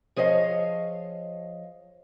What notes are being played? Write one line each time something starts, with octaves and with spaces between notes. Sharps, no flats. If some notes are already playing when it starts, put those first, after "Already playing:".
F3 G#4 C#5 D#5 F5